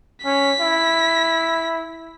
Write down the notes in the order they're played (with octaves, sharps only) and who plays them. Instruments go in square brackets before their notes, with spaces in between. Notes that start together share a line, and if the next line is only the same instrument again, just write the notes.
[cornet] C#4 [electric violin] B6
[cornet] E4